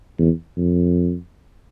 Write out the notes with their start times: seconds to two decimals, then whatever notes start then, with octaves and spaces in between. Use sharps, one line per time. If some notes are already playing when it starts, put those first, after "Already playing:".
0.19 E2
0.57 F2